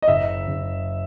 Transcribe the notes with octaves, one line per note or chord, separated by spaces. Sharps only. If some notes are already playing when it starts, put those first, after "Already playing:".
D#5
F#1 E5
F#1